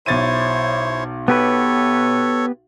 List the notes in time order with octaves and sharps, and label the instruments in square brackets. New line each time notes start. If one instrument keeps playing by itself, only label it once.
[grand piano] B1 A6 D#7 [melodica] E4 C5 C#5
[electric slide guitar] B3 G4 B4 [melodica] A4 C#5